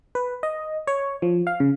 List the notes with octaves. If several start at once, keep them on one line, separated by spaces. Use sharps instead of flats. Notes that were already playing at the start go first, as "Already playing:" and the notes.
B4
D#5
C#5
F3
F5
C#3